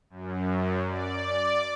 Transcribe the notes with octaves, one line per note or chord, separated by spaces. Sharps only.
F#2
D5